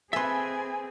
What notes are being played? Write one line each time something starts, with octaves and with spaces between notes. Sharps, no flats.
C4 G#4 A4 B4 E5 G#5 C6